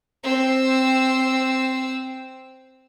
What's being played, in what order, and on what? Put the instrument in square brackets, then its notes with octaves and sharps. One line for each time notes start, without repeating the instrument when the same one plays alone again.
[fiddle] C4 E6